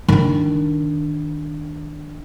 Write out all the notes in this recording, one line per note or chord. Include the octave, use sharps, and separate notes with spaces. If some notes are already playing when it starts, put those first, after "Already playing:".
D#3 D4